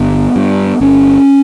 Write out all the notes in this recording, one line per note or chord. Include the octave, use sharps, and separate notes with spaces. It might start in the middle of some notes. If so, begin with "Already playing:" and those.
Already playing: G1 B3
G2
G1 C#4